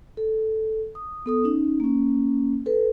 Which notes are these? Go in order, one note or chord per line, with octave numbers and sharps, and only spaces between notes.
A4
D#6
B3 A4 D#6
C#4 D#4
A#3 C#4
A4 B4